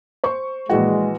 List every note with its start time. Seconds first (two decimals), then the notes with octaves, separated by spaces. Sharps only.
0.24 C5 C#6
0.70 A#1 E3 G#3 F#4